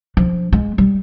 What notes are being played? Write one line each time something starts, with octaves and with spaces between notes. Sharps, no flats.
F3 D4
G#3
G3